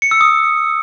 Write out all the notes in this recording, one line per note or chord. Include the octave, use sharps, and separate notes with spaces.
C#7
E6
D#6